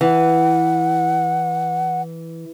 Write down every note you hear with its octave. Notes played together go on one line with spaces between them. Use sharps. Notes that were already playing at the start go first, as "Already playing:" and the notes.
E3 F#5